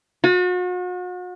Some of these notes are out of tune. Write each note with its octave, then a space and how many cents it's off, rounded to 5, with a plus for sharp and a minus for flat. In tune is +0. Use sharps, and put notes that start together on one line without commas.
F#4 -40